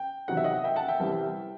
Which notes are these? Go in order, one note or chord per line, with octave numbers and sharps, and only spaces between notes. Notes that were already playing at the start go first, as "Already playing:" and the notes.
Already playing: G5
E2 C3 D#3 F#3 F#5
E5
D#5 F#5
E5 G5
F#5 A5
E5 G5
C2 C3 E3 G3